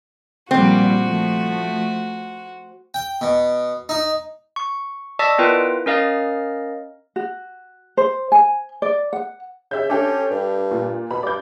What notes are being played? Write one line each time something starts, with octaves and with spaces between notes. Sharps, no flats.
A#2 F3 G3 C4 F#4
F3 A3
G5
B2
D#4
C#6
D5 D#5 A5 C#6 E6 B6
B3 E4 F4 A#4 B4 G5
C#4 A#4 D#5 F5 F6 A6
F#4
C5
G#5
D5
F#5
C#3 G4 E5 G6
C#4 D4 G4 A4
G2
A#2
B2 B5
G2 D5 G6